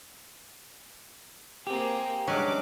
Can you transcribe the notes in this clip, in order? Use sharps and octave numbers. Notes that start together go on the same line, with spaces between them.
A#3 C4 G4 G#4
G2 F#3 G#3 C#4 D4 F#4 G#5 D6